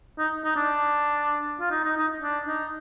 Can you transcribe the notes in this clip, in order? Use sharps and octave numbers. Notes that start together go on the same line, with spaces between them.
D#4
D#4
D4
F4
D#4
D#4
D#4
D4
D#4